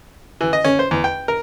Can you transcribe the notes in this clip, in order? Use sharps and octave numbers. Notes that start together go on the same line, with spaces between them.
E3
D#5
C#4
C5
E2
G5
A#4